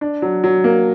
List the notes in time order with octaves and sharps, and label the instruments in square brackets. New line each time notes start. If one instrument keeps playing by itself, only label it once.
[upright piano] D4
F#3
F#3
A#3